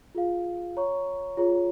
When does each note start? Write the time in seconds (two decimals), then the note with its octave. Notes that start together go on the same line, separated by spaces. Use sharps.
0.15 F4 G#4 F5
0.77 C#5 A#5 C#6
1.37 F4 G#4 C#5 A#5